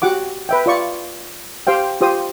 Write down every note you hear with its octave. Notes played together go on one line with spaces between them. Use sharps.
F#4 G4 F#5 D6
B4 E5 G5
F4 D5 C#6
G4 C5 F5 G5
F4 G4 C5 D#6